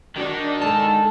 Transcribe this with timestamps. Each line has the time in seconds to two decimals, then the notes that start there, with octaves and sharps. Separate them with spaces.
0.16 D#3 D4 F#4
0.62 G#3 A4 A5